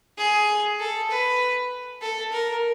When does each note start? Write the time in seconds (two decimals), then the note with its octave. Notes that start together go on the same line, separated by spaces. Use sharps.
0.18 G#4
0.80 A4
1.10 B4
2.02 A4
2.32 A#4